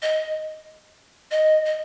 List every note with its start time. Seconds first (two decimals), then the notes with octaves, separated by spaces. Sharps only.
0.02 D#5
1.31 D#5
1.65 D#5